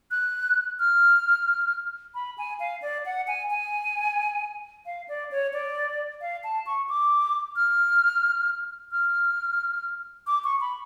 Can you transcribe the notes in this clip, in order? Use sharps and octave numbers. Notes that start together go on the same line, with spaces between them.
F#6
F6
B5
G#5
F5
D5
F#5
G#5
G#5
F5
D5
C#5
D5
F5
A5
C#6
D6
F6
F6
D6
C#6
B5